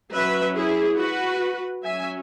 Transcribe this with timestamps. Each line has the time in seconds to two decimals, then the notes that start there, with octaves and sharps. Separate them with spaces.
0.13 F#3 C#4 B4 E5
0.56 E4 G#4
0.98 F#4 B4
1.84 F#3 C#4 E5 G#5